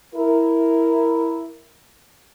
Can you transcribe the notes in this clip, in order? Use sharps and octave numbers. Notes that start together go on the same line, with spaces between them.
E4 A#4